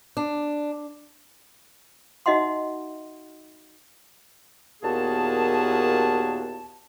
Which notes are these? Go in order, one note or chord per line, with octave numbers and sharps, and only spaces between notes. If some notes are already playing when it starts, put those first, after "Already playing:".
D4
D#4 F#4 D#5 E5 F#5 C6
D#2 A#2 B3 F#4 G#4 A5